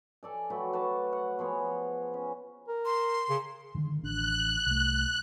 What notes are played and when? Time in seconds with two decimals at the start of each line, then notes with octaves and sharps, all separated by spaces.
0.23 A4 D5 G#5
0.50 F#3 A3 B4 G5
0.73 F#4 B4 A5
1.13 F#5
1.39 F3 B3 G#4 C#5
2.14 C#4
2.68 A#4
2.86 C6
3.29 C#3
3.75 D3 D#3 G#3
4.03 A1 D4 F#6
4.67 C2 A3